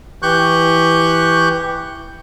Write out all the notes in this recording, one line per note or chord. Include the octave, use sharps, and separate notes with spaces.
E3 G4 C#6 F#6 G6